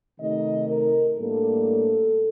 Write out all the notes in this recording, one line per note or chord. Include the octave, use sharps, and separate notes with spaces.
C3 D#3 A3 D#4 D#5
A#4
A2 G3 A#3 D4 A4